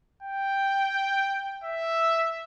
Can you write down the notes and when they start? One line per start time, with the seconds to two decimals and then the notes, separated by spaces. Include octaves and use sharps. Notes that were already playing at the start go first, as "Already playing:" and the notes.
0.23 G5
1.64 E5